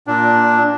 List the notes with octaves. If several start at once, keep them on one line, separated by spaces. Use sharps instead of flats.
A#2 D4